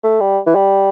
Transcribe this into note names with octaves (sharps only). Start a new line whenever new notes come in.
A3
G3
E3
G3